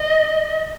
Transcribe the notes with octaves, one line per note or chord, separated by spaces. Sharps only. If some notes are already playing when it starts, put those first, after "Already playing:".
Already playing: D#5